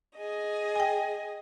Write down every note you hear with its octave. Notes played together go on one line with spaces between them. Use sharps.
G#4 D#5
G5 G#5